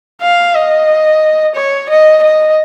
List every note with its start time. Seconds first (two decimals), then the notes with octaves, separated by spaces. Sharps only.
0.21 F5
0.55 D#5
1.55 C#5
1.89 D#5
2.23 D#5